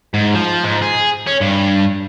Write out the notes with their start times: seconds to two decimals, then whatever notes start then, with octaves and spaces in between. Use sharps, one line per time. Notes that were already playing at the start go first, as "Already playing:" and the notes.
0.14 G#2
0.35 F3
0.64 G#2
0.82 G#4
1.27 C#4
1.41 G2